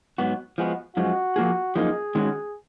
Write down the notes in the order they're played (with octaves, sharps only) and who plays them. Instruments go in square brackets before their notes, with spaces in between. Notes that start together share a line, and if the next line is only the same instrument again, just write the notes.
[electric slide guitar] G#2 F#3 B3 F#4
F3 G#3 B3 F#4
[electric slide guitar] F#2 F3 G#3 [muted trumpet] F#4
[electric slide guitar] F3 A#3 F4 G#4
[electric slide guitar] F#2 F3 A#3 D#4 [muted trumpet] G#4
[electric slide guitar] D#3 G#3 C#4 F#4